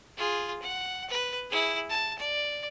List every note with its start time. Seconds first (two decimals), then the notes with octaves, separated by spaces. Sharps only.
0.17 F4 G#4
0.62 F#5
1.10 B4
1.50 E4 G#4
1.89 A5
2.18 D5